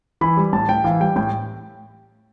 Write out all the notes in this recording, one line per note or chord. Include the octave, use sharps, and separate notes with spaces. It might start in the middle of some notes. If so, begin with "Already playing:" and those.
E3 B5
G3
A2 A5
A2 G5
E3 F5
G3 G5
A2 G5